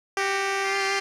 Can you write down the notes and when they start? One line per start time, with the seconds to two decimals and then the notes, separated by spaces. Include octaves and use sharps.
0.17 F#4 G4
0.64 F4